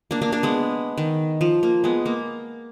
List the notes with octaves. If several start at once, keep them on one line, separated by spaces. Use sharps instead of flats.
A#3 D4
A#3 D4
A#3 D4
G#3 B3
D#3
F3
A#3
G#3 B3
A#3